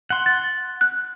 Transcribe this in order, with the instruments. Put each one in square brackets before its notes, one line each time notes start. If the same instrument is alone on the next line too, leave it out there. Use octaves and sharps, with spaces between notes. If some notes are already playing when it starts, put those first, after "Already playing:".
[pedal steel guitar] F#5 C6
[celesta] A6
F#6